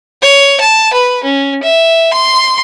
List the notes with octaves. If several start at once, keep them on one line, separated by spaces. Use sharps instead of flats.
C#5
A5
B4
C#4
E5
C6